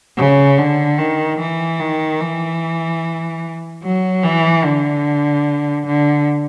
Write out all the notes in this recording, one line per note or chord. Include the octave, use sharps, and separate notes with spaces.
C#3
D3
D#3
E3
D#3
E3
F#3
E3
D3
D3